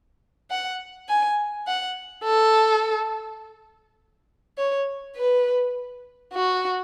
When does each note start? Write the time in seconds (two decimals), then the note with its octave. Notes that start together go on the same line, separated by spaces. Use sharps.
0.51 F#5
1.09 G#5
1.67 F#5
2.24 A4
4.58 C#5
5.16 B4
6.33 F#4